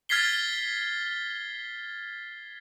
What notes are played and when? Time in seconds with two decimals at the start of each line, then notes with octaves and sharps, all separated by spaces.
0.09 F6 G#6 A6 B6 C7 G7